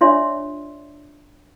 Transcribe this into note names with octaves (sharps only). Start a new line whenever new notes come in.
D4 F4 C#5 D5 E5 C6